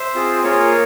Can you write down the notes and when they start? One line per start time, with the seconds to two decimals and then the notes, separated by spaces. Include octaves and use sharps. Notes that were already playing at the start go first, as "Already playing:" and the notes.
Already playing: C5 E5
0.15 C4 F4 G#4
0.43 A#3 F4 G#4 A#4 C#5